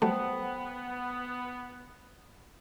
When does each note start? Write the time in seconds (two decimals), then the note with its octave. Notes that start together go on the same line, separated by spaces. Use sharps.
0.02 F#3 G3 A3 B3 C5 F#5 G5